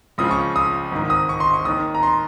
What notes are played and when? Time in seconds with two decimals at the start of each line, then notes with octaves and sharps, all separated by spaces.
0.18 C#2 C#3 F3 D#6
0.31 C#6
0.56 D#6
0.92 G#1 G#2 D#3
1.10 D#6
1.29 C#6
1.40 C6
1.54 C#6
1.65 D#2 D#3 D#6
1.95 A#5
2.03 C6